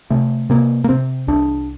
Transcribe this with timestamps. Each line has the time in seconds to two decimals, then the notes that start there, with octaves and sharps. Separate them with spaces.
0.10 C3 A3
0.50 C3 A#3
0.84 A#3
0.89 C3 C4
1.28 C2 D4